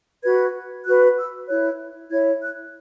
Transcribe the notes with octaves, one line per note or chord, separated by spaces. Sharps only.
F#4 B4 G#6
F#4 B4 F#6
E6
E4 C#5 F#6
E4 C#5 G#6
F#6